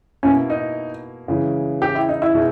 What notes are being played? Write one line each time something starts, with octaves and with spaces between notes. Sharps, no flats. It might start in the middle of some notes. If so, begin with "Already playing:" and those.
B2 A#3 C#4 E4
D#4
C#3 E3 G#3
G4
E4
D#4
E4
B2 G#3 D#4